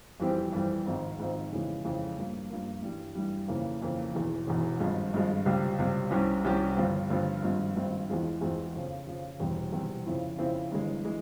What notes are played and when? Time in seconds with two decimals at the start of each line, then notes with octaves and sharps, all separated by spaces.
0.20 F2 E3 G3 C4 G4
0.53 F2 E3 G3 C4 G4
0.86 G#1 G#2 F3 C4
1.18 G#1 G#2 F3 C4
1.51 F2 C#3 E3 G#3
1.84 F2 C#3 E3 G#3
2.17 G2 F3 A#3
2.50 G2 F3 A#3
2.83 G2 E3 G3
3.15 G2 E3 G3
3.48 F2 C#3 E3 A#3
3.82 F2 C#3 E3 A#3
4.14 E1 E2 E3
4.47 E1 E2 E3
4.80 G#1 G2 F3 G#3
5.13 G#1 G2 F3 G#3
5.46 C#2 C3 G3
5.78 C#2 C3 G3
6.11 C2 C3 G3 C#4 G4
6.45 C2 C3 G3 C#4 G4
6.77 G1 G2 F3 C4
7.10 G1 G2 F3 C4
7.42 G#1 G2 F3 C4 F4
7.76 G#1 G2 F3 C4 F4
8.09 E2 E3 G#3 C4 F4
8.41 E2 E3 G#3 C4 F4
8.74 F2 C#3 F3
9.06 F2 C#3 F3
9.39 E1 E2 C3 G3 C4
9.72 E1 E2 C3 G3 C4
10.06 F2 C#3 F3 C4 E4
10.38 F2 C#3 F3 C4 E4
10.71 G1 G2 E3 G#3
11.05 E3 G#3